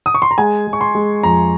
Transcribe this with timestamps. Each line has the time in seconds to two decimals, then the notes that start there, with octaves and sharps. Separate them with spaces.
0.06 D#6
0.15 C#6
0.22 C6
0.31 A#5
0.38 G#3 G#5
0.67 G#3
0.73 C#6
0.81 C6
0.95 G#3
1.23 F2 A#5